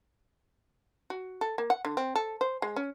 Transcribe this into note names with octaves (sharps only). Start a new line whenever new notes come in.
F#4
A4
A#3
F#5
D3
C4
A4
C5
G#3
C#4